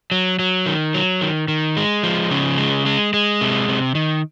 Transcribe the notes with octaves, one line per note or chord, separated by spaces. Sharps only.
F#3
F#3
D#3
F#3
D#3
D#3
G#3
F3
C#3
G#3
G#3
G#3
C3
C3
D#3